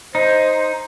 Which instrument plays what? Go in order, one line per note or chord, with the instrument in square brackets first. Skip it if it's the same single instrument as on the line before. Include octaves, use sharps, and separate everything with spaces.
[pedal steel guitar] D#4 [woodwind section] C5